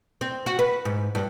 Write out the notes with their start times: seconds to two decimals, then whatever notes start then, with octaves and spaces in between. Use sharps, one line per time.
0.21 C4
0.46 F#4
0.59 B4
0.85 G#2
1.15 G2